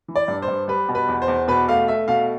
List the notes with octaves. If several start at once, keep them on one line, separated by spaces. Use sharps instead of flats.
E3
D5
G2
C5
G2
G3 B4
B2
B4
E2
C5
E2
B2 B4
A3 F5
A3 E5
B2 F5